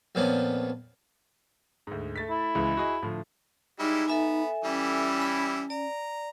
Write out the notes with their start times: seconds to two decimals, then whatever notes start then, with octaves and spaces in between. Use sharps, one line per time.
0.15 F2 A#2 F3 B3 C#4 D4
1.87 D2 G#2
2.16 A3 A6 B6
2.30 E4
2.55 C#2 E3 G#3
2.77 F#4 G#4 D#5
3.02 A2 D3 F3
3.80 G3 G#3 D#4 E4
4.08 B3 A4 E5 G#5
4.64 E3 G3 C#4 E4
5.21 B5
5.70 D5 A#5